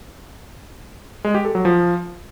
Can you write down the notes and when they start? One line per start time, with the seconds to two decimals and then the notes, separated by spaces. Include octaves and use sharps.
1.24 G#3
1.35 G4
1.45 A4
1.55 F#3
1.65 F3